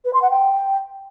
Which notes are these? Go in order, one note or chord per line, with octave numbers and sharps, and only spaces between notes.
B4
C6
F#5
G5